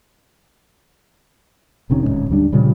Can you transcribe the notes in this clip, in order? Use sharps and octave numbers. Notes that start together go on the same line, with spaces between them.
F1 C3 D#3 C#4
D1 A#1 G#2 C#4
D2 G3 D4
A#2 C#3 F3 G3